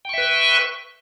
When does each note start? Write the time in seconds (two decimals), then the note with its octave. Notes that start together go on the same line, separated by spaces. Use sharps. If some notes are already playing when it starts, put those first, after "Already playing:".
0.05 G5
0.09 C#6
0.13 E5
0.18 B4